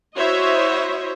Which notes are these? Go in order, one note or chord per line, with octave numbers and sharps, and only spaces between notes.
E4 F#4 C5 C#5 D#5 E5